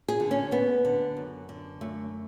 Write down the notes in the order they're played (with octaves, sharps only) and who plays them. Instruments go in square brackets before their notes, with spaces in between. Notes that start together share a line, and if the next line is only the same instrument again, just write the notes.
[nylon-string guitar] G#4
D3
C#4
D2 B3
D3
F#2
D3
F#2 A3